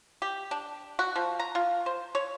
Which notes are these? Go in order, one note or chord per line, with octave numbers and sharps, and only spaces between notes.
G4
D4
F#4
F3
A#5
F4
C5
C#5